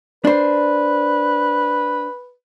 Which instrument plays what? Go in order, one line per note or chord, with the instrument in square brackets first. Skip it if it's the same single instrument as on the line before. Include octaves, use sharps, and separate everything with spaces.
[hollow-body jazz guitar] D4 C5 [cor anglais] B4